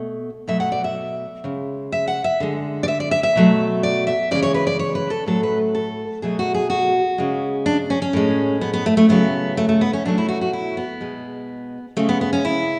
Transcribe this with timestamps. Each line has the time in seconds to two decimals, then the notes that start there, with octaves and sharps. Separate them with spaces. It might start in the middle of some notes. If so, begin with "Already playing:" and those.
Already playing: B2 A3
0.48 B2 F#3 A3 E5
0.60 F#5
0.72 D5
0.84 E5
1.44 C#3 G#3
1.92 E5
2.08 F#5
2.24 E5
2.40 D3 G#3
2.83 D5
2.88 E5
3.00 D5
3.11 E5
3.23 E5
3.36 B2 F#3 A3
3.83 D5
4.07 E5
4.31 C#3 E3 G#3 D5
4.42 C#5
4.54 B4
4.67 D5
4.79 C#5
4.95 B4
5.10 A4
5.26 A2 F#3 A3 A4
5.43 B4
5.75 A4
6.22 B2 F#3 A3 G#4
6.39 F#4
6.54 G#4
6.70 F#4
7.18 C#3 G#3
7.66 D4
7.90 C#4
8.02 C#4
8.13 A2 G#3
8.61 B3
8.73 B3
8.86 A3
8.97 A3
9.09 C#3 F#3 A3 B3
9.57 A3
9.69 A3
9.81 B3
9.93 C#4
10.05 B2 F#3 A3 D4
10.18 E4
10.29 F#4
10.41 F#4
10.53 E4
10.77 B3
11.01 B2 G#3
11.97 C#3 G#3 A3
12.09 B3
12.21 B3
12.33 C#4
12.45 E4